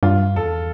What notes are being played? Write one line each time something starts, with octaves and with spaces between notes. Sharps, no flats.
G2 F4
E2 A4